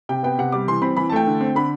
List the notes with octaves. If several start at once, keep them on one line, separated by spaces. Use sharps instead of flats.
C3 G5
B3 G5
C3 F#5
G3 D6
E3 C6
C4 B5
E3 B5
A5
A3 G5
D3
C4
D3 B5